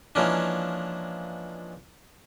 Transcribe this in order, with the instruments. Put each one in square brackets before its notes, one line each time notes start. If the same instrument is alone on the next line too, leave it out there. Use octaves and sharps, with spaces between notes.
[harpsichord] E3 F3 G#3 A#3 C#4 D4